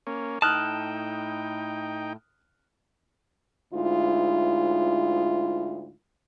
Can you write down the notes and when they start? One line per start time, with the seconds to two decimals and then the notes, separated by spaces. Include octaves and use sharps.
0.07 A#3 C#4
0.42 A2 D#4 G5 A5 D#6 F6 F#6
3.74 D2 G#2 E4 F4